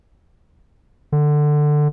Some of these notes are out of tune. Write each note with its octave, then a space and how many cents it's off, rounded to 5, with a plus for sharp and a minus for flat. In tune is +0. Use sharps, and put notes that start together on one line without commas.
D3 +15